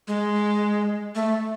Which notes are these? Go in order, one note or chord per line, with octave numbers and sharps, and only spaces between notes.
G#3
A3